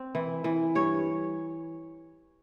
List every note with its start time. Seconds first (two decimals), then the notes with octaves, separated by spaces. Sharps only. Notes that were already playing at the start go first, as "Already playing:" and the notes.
Already playing: C4
0.15 E3
0.44 E3
0.75 G2 C#5